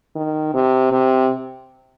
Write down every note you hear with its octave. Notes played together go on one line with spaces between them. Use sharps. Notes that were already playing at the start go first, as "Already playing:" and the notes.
D#3
C3
C3